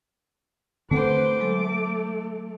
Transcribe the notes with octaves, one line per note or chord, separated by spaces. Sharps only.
D3 A3 C4 A4 B4 C5 F#5 D6
F#3 G#3 A3 A4